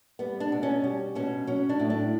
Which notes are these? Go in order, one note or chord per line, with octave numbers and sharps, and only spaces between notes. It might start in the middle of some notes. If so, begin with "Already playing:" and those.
G3 B3
D4
B2
C#4
G3
B2 C#4
F#3 C#4
D4
A2
D4